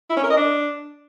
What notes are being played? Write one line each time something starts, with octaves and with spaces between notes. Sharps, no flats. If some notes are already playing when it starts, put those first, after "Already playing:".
E4
C#4
A#4
D#5
D4